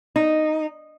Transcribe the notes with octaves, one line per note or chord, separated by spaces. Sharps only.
D#4